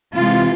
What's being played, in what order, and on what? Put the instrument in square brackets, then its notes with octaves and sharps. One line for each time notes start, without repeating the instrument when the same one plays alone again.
[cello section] C3 E3 G#3 F4